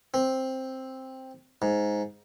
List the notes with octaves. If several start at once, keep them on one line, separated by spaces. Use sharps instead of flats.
C4
G#2